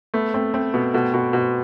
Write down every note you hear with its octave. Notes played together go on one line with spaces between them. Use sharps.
A3 B3
A3 C4
A3 C4
B2 B3
B2 A3
B2
B2